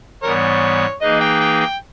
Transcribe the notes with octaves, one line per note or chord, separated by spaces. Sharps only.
G#2 E3 G3 B3 A#4 C#5
E3 A#3 D#4 G#4 B4 D#5
G5
G5
G5